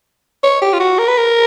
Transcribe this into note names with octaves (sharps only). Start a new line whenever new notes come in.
C#5
G4
F4
F#4
A#4
B4
A#4